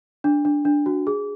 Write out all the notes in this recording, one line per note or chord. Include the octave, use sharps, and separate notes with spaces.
D4
D4
D4
F#4
G#4